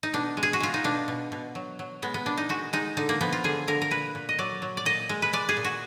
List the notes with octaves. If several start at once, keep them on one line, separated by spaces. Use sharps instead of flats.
D#4
B2 D4
G#3
G#4
F#4
G#3 F4
D#4
B2 D4
B2
B2
F#3
F#3
G#3 B3
B3
A#2 D4
D#4
G#3 F#4
G#3 D#4
D3 D#4
A#3
F3 B3
F4
D3 G#4
D3 A#4
A#4
A#2 B4
A#2
D#5
F#3 D5
F#3
D5
A#2 D#5
G#3
B4
G#3 D5
G#4
A#2
F#4